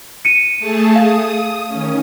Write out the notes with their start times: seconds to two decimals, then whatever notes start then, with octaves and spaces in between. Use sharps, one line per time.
0.25 C#7 D#7
0.59 A3 G#4 A5
0.96 F5 D#6
1.68 D#3 C#4